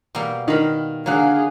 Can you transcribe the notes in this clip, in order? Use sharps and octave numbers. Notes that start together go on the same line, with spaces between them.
B2 G3 A#3
D#3 F5 B5
D3 F#3 A#3 G#4 F5 F#6